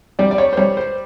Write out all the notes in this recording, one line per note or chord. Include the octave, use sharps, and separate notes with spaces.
G3 D5
D5
C#5
C5
G3 C#5
C5